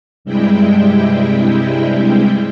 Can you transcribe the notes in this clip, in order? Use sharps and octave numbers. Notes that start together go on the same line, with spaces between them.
G2 C3 G3 G#3 E4 G5